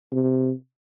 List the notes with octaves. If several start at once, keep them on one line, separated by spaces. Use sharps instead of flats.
C3